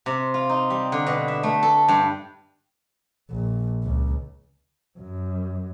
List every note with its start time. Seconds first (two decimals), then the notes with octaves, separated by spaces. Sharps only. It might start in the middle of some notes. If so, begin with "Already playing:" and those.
0.06 C3
0.34 F4
0.49 D#4
0.70 G3
0.92 D3
1.07 B2
1.28 E5
1.43 A3
1.63 A4
1.88 G2
3.31 A#1
3.83 C#2
4.99 F#2